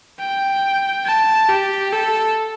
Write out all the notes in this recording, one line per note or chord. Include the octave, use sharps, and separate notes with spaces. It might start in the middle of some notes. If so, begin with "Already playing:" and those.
G5
A5
G4
A4